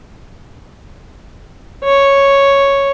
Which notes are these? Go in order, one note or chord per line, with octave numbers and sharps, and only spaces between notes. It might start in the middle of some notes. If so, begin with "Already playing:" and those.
C#5